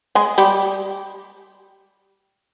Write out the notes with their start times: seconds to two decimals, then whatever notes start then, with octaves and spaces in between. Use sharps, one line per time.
0.15 G#3 G#4
0.38 G3 G4